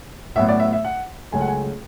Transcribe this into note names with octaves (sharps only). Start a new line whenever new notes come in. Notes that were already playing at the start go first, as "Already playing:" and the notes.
A1 A2 F#3 B3 E5
D5
E5
E5
F#5
C#2 C#3 F#3 A3 G#5
F#5
G#5